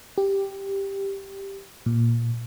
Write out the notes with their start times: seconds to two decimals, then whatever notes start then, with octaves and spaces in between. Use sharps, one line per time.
0.18 G4
1.86 A#2